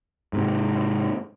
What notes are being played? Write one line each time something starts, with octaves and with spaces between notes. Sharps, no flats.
G#2 C3